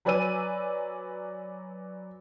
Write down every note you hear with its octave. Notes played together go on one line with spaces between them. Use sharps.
F#3 B4 D5 G#5 E6 D#7